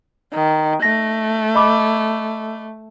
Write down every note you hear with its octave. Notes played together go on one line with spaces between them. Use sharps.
D#3
A3 A#6
D#5 B5 D6